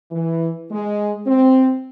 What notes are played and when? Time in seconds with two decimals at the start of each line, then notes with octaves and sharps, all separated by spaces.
0.11 E3
0.71 G#3
1.27 C4